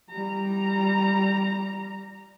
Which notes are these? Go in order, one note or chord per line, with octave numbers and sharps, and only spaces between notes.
G3 A#5